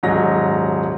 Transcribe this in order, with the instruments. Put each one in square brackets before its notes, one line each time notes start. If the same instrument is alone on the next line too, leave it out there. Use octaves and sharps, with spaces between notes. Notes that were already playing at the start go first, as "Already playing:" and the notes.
[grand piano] D#1 G#2 F#3 A#6